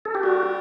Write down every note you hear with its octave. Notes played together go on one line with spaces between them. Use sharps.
A4
G4
G3 F#4